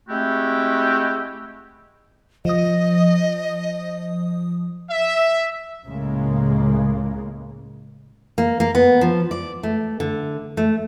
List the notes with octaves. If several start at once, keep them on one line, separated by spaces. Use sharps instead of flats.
G#3 A3 C4 E4 F#4 G4
F3 D#5 D#6
E5
C#2 A2 C#3 G#3 A#3
A#3
A#3
B3
F3
D5
A3
D3
A3